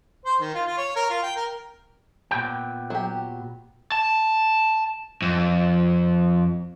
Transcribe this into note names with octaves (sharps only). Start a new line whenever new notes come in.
C5
D#3
F4
F4
C#5
A#4
F4
G5
A#4
A#2 B3 G5
F#3 G4
A5
F2